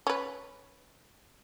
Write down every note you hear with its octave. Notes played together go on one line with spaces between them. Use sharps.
C#4 B4